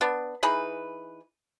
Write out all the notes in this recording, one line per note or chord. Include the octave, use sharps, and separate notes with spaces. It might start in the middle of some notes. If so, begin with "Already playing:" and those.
B3 D4
E3 D#4 G#4 B4